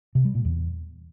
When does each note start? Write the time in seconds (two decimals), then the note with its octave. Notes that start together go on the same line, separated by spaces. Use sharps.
0.15 C3
0.25 G3
0.35 A#2
0.45 E2